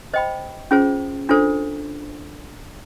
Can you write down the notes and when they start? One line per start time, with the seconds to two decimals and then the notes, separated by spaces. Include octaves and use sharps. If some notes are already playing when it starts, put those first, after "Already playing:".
0.14 C5 D#5 G5 B5
0.71 C#4 F4 G#4 C5
1.29 D4 F4 A4 C5